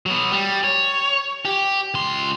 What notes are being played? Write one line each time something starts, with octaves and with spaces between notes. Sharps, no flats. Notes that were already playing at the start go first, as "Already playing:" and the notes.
F#3 B3
G3
C#5
G4
C#2 C6